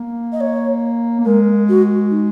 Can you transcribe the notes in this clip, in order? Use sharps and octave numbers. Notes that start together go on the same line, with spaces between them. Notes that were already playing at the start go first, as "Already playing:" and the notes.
Already playing: A#3
D#5
C#5
A#3
G#3 A#4
F#4
D#4